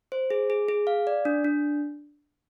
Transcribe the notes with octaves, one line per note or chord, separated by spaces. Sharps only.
C5
G#4
G#4
G#4
F5
D5
D4
D4